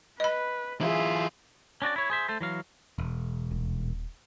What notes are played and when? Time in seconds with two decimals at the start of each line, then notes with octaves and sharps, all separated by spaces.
0.20 B4 D#5 B5
0.81 E3 F4 G#4 E5
1.82 C#4 D4 F#4 D5
1.96 E4 C#5
2.10 G#4 C5 E5
2.28 A3 A4 C5
2.41 E3 F#3 F5
2.98 E1
3.51 D#1